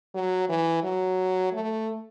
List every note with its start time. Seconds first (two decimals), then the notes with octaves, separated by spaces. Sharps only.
0.15 F#3
0.49 E3
0.83 F#3
1.53 A3